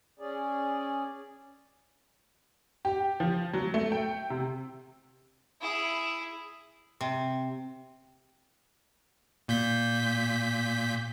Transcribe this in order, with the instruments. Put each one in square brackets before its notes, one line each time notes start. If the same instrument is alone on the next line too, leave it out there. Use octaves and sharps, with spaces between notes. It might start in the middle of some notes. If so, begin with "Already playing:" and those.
[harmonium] C#4 G#4 D5
[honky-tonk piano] G4
F3
F#3
A3
G5
C3
[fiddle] E4 G#4
[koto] C3
[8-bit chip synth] A#2 G6 B6